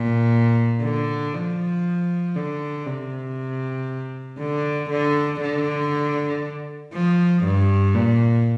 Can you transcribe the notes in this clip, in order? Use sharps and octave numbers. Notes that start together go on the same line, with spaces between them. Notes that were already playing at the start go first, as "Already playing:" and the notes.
Already playing: A#2
D3
F3
D3
C3
D3
D3
D3
F3
G2
A#2